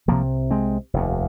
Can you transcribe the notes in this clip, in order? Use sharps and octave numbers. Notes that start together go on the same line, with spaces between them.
C2 C3 F3 A#3
G#3 C4
F1 D#2